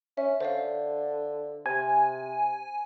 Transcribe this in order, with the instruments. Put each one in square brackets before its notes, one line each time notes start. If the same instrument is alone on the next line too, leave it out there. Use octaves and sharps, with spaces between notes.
[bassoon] C#4 [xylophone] E5
[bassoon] D3 [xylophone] C5 D5 F5
[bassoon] C3 [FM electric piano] G#5